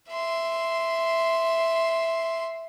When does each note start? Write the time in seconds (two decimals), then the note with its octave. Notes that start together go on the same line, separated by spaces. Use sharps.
0.10 E5 C6